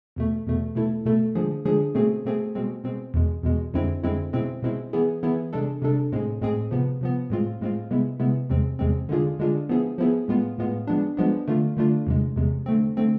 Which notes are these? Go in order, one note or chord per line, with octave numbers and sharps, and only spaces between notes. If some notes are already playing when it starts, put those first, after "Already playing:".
E2 B2 A3
E2 B2 A3
B2 A3 E4 A4
B2 A3 E4 A4
D3 F3 G#3 D4 G#4
D3 F3 G#3 D4 G#4
B2 A3 C4 G#4
B2 A3 C4 G#4
B2 G#3 C4
B2 G#3 C4
E2 B2 G#3
E2 B2 G#3
F2 D3 G#3 C4 E4
F2 D3 G#3 C4 E4
B2 G#3 C4 E4
B2 G#3 C4 E4
E3 B3 E4 G#4
E3 B3 E4 G#4
C3 G#3 D4 A4
C3 G#3 D4 A4
A2 G#3 C4 G#4
A2 G#3 C4 G#4
C3 F3 B3
C3 F3 B3
A2 G#3 C4 F4
A2 G#3 C4 F4
C3 G#3 B3 E4
C3 G#3 B3 E4
E2 C3 G#3 C4
E2 C3 G#3 C4
D3 G#3 D4 F4 G#4
D3 G#3 D4 F4 G#4
F3 B3 E4 G#4
F3 B3 E4 G#4
A2 G#3 B3 F4
A2 G#3 B3 F4
F3 G#3 B3 D4
F3 G#3 B3 D4
D3 A3 D4 F4
D3 A3 D4 F4
E2 C3 G#3
E2 C3 G#3
D3 A3 C4
D3 A3 C4